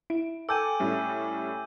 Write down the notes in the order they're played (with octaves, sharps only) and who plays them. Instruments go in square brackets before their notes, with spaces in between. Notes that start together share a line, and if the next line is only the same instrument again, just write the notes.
[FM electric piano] E4 [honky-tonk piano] D7
[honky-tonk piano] A4 [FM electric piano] G5 G#5 D6 [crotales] E6 G6 D#7
[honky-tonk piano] A2 G3 C#4